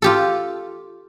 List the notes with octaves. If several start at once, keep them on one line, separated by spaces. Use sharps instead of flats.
F4 G4 A4